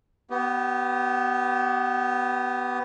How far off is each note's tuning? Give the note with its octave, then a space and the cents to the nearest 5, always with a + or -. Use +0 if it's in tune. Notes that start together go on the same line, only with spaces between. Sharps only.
B3 +0 G4 -35